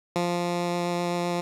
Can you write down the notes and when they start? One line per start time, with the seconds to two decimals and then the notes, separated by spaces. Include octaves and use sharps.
0.16 F3